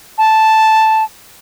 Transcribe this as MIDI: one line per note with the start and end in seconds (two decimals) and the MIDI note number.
0.18 1.04 81